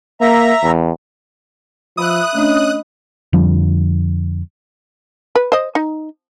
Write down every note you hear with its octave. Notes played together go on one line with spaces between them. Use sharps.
A#3 E5 A#5
E2
F3 E5 B5 D6 D#6 F#6
A3 C#4 D4 D#5
F2 D3 F3 G3
B4
C5 D#5
D#4